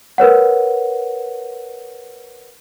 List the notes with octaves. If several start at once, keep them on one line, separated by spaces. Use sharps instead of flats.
A#4 B4 C#5 F#5